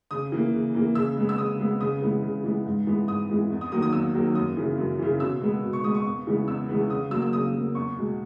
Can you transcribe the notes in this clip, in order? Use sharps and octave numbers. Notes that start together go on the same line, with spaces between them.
C#3 D#6
E3 A#3
C#3
E3 A#3
C#3 E6
G#3 B3
E6
C#3 D#6
G#3 B3
C#3 D#6
E3 G#3 B3
C#3
E3 G#3 B3
G#2
E3 G#3 B3
G#2 D#6
E3 G#3 B3
E2
D#6
D#3 F#3 A#3 D#6
D#6
E2 E6
D#3 F#3 A#3
F#2 D#6
C#3 E3
F#2
C#3 E3
B2 E6
G#3 B3
B2
C#6
G#3 B3 D#6
C#6
E2
C#3 E3 G#3 B3
E2 E6
C#3 E3 G#3 B3
C#3 D#6
F#3 A#3 E6
E6
C#3 D#6
F#3 A#3
E2 C#6
B2 G#3